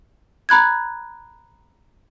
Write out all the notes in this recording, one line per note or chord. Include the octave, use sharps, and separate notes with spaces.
A#5 B5 F#6 G#6